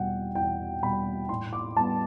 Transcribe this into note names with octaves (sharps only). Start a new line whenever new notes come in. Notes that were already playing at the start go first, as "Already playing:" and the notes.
Already playing: E2 B2 G3 F#5 G5
E2 G5
B2 G3 B5
A2 C6
D6
G3 B3 A5